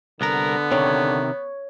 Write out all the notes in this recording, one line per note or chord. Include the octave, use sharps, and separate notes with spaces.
C2 D3 B3 A#4
C3 D#3 C#5